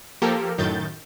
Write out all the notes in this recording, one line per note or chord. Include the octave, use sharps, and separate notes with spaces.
F3 A#3 G4 A4 A#4
F#2 A2 D#3 G6 A6